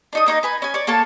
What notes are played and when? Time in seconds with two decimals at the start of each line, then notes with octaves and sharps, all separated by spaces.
0.13 D4 D#4 D#6
0.26 A#3 D#4 C#5 D#5
0.43 B4 G#5 B5
0.62 C#4 G#5
0.74 C#5 D5
0.87 A#3 A4 C#5 A5